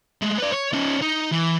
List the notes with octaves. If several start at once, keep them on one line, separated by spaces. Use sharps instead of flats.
G#3 A3
B4 D5
C#5
C#4 D#4
D#4
E3